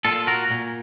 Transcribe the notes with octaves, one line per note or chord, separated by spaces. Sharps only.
A#2 F4 A4
F#4 A#4
A#2